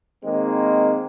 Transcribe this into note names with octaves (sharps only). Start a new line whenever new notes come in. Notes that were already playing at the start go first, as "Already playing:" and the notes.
D#3 G#3 A#3 C4